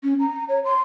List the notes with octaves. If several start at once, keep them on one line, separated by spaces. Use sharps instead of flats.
C#4
A#5
C#5
C6